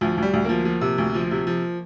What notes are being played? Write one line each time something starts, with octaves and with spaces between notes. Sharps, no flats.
D2 F3
D2
G3
D2
F3 A#3
F3
C3
D2
F3
C3
F3